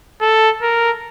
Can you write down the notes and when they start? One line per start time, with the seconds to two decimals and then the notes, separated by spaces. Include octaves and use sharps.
0.21 A4
0.62 A#4